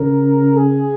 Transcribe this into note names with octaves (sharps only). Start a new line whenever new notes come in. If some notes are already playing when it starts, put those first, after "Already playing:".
Already playing: C#3 A#4
G#4